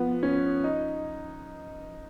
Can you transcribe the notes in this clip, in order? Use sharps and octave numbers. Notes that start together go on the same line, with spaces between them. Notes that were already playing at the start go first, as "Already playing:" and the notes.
Already playing: F3 B3
C#4
D#4